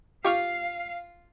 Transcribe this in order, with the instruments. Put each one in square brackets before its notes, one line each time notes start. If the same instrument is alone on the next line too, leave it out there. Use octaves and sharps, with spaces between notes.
[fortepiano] F4 [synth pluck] G4 C#6 F6 [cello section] F5